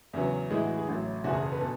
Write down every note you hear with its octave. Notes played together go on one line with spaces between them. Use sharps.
E2 C#3 F#3 B3
A2 E3 G#3 G#4
F#4
G#4
A1 A2 F#3
F#1 E2 B2 F#4
G#4
A4
B4
B2 A4